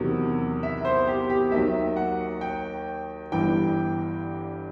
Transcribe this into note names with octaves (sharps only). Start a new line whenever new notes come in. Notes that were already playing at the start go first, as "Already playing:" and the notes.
Already playing: E2 C3 D#3 F#3
E5
C5
G4
G4
D#2 D#3 F#3 E5
F#5
G5
G1 G2 E3 G5